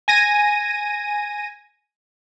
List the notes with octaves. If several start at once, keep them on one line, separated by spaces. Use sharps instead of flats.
G#5 A#6 D#7